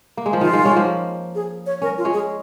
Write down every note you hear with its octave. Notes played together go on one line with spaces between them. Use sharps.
A#3
G#3
F3
D#3 F4
D#3 G#3
G#3 C#4
F3 A#3
G#4
C#5
C#4 A#4
F4
G#3 C#4
G#4